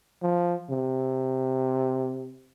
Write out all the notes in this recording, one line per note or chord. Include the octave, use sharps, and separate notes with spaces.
F3
C3